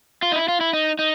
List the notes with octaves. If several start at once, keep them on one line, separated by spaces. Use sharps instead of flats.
F4
D#4
E4
F4
E4
D#4
D#4